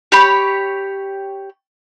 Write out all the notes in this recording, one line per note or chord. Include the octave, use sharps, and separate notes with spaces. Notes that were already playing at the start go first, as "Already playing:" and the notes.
G4 C#5 B5